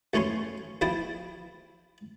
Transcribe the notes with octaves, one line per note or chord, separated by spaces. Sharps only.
B1 A3 C#4 C#5 C6
B1 F3 E4 G5 A5